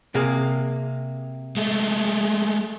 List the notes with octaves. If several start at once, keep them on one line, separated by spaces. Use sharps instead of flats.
C3 A#3 G#4
G#3 A3